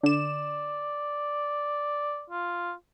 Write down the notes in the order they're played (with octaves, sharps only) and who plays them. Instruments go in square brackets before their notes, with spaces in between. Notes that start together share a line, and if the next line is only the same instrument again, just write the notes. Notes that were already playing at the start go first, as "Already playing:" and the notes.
[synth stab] D3 E7 [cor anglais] D5
[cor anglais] F4